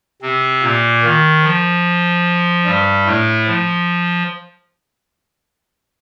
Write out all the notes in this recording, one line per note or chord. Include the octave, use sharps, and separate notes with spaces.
C3 C4
A#2 A#3
D#3
F3
G2 G3
A2 A3
F3